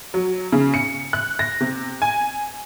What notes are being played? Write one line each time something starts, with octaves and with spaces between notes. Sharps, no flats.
F#3
C#3
C#7
F#6
A#6
C3
G#5